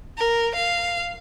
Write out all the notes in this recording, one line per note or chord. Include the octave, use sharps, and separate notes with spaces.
A#4
F5